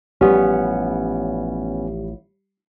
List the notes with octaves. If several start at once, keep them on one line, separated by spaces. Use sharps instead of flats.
A1 F3 G3 B3 C#4